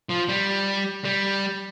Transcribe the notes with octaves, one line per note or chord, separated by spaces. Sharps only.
F3
G3
G3